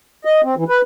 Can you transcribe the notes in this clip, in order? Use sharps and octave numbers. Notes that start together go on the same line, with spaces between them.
D#5
C4
E3
B4